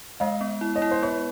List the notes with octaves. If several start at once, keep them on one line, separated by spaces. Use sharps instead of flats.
G#3 D#5 F5
B3
E4
C#5 D#5
E4
C5
B3 B4 C#5